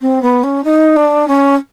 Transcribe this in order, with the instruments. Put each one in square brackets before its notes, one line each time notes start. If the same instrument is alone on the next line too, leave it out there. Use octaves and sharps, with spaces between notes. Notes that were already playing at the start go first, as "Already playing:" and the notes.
[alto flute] C4
B3
C#4
D#4
D4
C#4